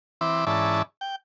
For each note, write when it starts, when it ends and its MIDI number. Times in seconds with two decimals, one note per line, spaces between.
0.21 0.45 52
0.21 0.45 60
0.21 0.45 64
0.21 0.45 86
0.47 0.82 44
0.47 0.82 52
0.47 0.82 61
0.47 0.82 64
0.47 0.82 74
0.47 0.82 81
1.01 1.16 79